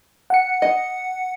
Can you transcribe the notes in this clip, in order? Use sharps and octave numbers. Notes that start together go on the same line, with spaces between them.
F#5 C#7
D#5